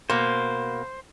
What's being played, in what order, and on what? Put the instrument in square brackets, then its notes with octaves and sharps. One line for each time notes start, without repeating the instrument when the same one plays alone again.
[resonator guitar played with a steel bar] B2 A#3 [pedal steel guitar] C5